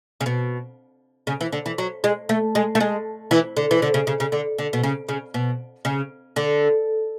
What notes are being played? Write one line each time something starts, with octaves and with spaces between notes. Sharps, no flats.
C#3
B2
C#3
E3
D3
E3
F#3
G#3
A3
G#3
A3
G#3
E3
D3
E3
D3
C#3
C#3
C#3
D3
D3
B2
C#3
C#3
B2
C#3
D3